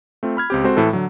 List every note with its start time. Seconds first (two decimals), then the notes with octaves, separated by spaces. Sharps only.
0.23 A3 C4 F4
0.37 B5 F6 G#6
0.50 C#2 C4 G4
0.64 G#3 C4 F#4 A4 C5
0.77 A2 E3 A4
0.93 D3 F#3